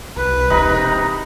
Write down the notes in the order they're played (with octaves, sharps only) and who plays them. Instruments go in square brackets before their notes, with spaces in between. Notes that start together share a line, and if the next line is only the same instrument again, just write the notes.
[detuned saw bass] C2 [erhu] B4
[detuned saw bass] E1 [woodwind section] C3 A#5 [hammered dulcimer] D#4 B5